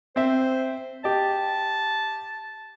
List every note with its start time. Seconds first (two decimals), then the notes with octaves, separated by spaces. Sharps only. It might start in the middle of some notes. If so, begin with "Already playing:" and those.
0.16 C4 C5 E5
1.04 G4 D#5 A5